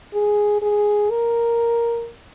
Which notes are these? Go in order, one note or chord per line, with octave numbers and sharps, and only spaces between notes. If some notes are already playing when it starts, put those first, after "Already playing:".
G#4
G#4
A#4